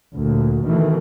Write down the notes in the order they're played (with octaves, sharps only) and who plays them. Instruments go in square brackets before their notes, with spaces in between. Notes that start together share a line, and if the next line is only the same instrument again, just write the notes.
[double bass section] D2 A#2
B2 D#3 E3 A3